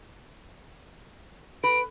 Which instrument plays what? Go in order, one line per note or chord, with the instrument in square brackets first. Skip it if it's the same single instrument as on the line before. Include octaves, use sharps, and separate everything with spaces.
[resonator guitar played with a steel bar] B4 [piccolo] D7